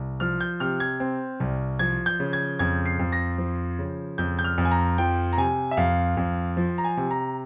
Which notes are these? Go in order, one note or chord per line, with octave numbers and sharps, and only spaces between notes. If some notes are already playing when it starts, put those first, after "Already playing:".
Already playing: C2
F3 F6
G6
C3 F6
G#6
C4
C2
F3 G#6
G6
C#3
G#6
F2 G#6
C7
F2
A#6
F3
C#3
F2 G6
G6
F6
F2
G#5
A#5
F3 G5
A#5
C3 G#5
E5
F2 F5
F2
F3
A#5
G#5
C3
A#5